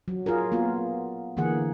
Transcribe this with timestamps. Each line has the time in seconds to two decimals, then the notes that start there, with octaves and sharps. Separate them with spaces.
0.08 F#3
0.26 F4 G#4 A#4
0.52 A#3 B3 F4 F#4
1.37 D3 E3 A#3 G#4 F#5